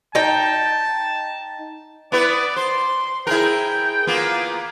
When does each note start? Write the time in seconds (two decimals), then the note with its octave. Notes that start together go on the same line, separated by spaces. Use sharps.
0.15 D#4 G5 A5
2.12 B3 E4 B4 D5
2.56 C5 C6
3.27 E4 G#4 A#4 G5
4.07 A#3 B3 F4 G#4